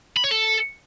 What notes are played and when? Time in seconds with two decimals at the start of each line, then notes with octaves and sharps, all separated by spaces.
0.17 B5
0.24 C#5
0.31 A4